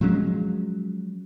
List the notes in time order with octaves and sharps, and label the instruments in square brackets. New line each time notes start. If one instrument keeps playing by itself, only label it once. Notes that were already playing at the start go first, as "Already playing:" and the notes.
[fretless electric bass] F3 F#3 G#3 C#4